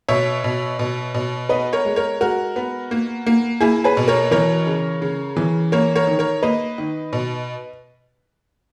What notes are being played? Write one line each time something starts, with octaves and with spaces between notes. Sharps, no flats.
B2 C#5 E5
B2
B2
B2
B3 B4 D#5
A#4 C#5
G#3
A#4 C#5
G#3 F#4 A#4
B3
A#3
A#3
A#3 E4 G#4
G#4 B4
B2
A#4 C#5
E3 A#4 C#5
C#3
C#3
E3
A#3 A#4 C#5
A#4 C#5
D#3
A#4 C#5
A#3 B4 D#5
D#3
B2